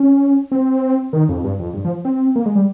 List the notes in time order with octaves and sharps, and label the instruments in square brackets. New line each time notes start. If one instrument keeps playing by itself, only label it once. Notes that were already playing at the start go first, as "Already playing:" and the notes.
Already playing: [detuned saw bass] C#4
C4
D#3
F2
G2
F2
G2
F3
C4
A#3
G#3
G3